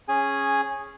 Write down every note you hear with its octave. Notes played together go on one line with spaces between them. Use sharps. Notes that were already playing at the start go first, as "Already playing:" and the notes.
C#4 G#4 G#5